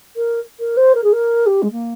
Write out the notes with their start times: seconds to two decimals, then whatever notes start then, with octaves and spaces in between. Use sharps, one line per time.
0.16 A#4
0.60 A#4
0.77 C5
0.95 A#4
1.03 G#4
1.12 A#4
1.46 G4
1.62 G#3
1.71 A#3